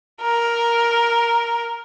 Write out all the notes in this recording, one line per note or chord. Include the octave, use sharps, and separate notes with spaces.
A#4